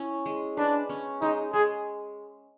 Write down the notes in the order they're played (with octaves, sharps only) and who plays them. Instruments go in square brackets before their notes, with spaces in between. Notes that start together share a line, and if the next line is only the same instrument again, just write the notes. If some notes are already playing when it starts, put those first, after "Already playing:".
Already playing: [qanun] C#4 E4
G#3
[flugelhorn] D4 [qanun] B4
[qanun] C#4
[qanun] G#3 [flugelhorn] D#4
[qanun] G#3 [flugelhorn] G#4